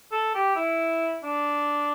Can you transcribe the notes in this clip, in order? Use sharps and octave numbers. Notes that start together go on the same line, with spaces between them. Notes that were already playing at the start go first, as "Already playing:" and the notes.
A4
G4
E4
D4